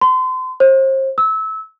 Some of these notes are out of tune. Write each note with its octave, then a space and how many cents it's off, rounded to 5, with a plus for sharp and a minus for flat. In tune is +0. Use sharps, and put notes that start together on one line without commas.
C6 -35
C5 +35
E6 -25